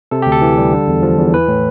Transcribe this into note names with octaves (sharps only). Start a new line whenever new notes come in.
C3 A4
D2 G4
A4
E3
G3
D3
E2
F3
E2
E3 B4
A2